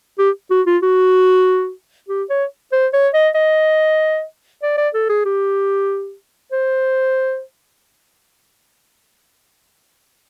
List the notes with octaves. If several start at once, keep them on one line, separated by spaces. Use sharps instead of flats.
G4
F#4
F4
F#4
G4
C#5
C5
C#5
D#5
D#5
D5
D5
A4
G#4
G4
C5